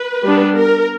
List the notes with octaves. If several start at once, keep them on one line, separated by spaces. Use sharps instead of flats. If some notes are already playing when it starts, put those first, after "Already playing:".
Already playing: B4
G3 B3 D4
A#4